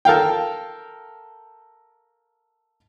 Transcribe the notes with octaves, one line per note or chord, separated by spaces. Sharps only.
A4 A#4 F5 G5